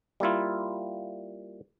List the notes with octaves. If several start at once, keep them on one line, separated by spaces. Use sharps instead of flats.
G3 A#3 E4 F4